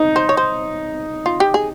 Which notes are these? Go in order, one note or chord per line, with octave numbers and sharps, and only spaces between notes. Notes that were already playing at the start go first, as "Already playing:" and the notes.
Already playing: D#4
C5
C#5
C5
F4
G4
G#4